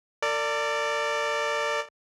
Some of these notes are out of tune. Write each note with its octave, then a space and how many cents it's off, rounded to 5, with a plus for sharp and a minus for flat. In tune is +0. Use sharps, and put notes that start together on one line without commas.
A#4 -45 D5 +0